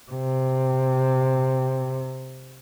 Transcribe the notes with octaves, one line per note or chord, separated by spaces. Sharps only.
C3